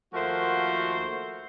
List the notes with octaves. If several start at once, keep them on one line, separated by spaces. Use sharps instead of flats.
D#2 F3 A3 F#4 A#4 C5